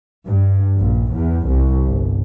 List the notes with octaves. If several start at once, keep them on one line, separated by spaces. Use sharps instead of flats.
G2
A#1
E2
C2
G1